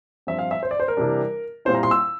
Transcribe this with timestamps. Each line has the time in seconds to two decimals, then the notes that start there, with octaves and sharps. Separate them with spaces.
0.27 G2 F3 C4 E5
0.39 F5
0.51 E5
0.63 C5
0.71 D5
0.80 C5
0.88 A#4
0.97 C3 E3 G3 D4
1.65 A#2 G3 C4 E4 C5
1.75 A#5
1.83 C6
1.91 E6